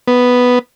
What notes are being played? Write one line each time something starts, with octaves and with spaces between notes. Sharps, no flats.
B3